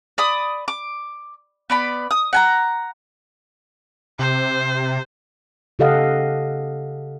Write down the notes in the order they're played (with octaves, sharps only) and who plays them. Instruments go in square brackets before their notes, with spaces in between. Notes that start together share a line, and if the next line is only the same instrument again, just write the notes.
[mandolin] D5 B5 D#6
D6
B3 D5 B5
D#6
F#5 G#5 A#5
[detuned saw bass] C3 [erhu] C5
[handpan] C#3 G4 A4 D#5 F5 F#5